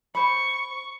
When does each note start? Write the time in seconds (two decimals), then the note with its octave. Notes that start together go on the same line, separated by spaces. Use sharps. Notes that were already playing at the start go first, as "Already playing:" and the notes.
0.15 C5 B5 C#6